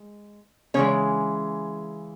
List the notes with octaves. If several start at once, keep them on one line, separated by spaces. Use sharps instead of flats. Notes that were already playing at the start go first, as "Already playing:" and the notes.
Already playing: G#3
C#3 E3 G#3 C#4 C#5